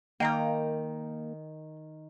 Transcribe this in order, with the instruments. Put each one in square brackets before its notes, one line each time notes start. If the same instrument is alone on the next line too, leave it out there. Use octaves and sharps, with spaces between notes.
[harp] D#3 [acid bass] A#3 [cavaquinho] G5 A#5 D#6